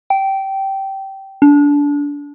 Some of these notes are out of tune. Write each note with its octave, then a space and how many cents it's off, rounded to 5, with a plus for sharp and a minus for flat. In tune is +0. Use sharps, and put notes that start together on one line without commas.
G5 -15
D4 -25